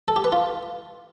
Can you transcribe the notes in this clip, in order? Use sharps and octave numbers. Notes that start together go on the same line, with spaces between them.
A4
G4
B4
F4